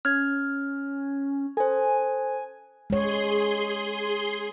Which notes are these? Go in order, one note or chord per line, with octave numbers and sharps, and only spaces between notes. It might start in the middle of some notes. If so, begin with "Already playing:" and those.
C#4 F6 G#6
A4 C5 G#5
G#3 G#4 C#5 C6